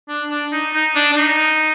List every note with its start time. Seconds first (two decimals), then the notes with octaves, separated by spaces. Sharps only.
0.09 D4
0.30 D4
0.52 D#4
0.74 D#4
0.95 D4
1.12 D4
1.17 D#4